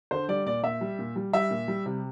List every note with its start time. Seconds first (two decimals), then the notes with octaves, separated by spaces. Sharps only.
0.11 D3 C5
0.28 G3 D5
0.46 A#2 D5
0.63 A#2 E5
0.81 G3
0.99 A#2
1.16 G3
1.33 G3 E5
1.50 A#2
1.68 G3
1.86 C3